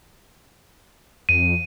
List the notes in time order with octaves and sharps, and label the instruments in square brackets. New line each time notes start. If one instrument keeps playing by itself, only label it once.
[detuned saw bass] F2 [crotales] D#7